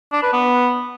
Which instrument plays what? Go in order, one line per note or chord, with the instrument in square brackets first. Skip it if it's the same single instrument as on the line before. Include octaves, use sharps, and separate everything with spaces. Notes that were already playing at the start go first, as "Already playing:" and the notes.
[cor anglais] D4
B4
B3